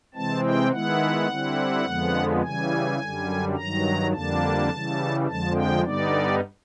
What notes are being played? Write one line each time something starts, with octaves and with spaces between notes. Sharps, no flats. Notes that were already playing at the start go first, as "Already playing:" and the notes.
C3 E3 G#3 C4 A5
G5
D#3 G#3 B3 E4 F#5
D3 G3 C4 E4
F2 D3 F3 G#3 B3
C#3 E3 G3 G#5
F#2 D3 G3
G2 D#3 F#3 A#5
F2 D3 G3 A#3 D4 A5
C#3 E3 G3
F2 D3 F3 G#3 A5
G5
G2 D3 G3 B3 D#4 D5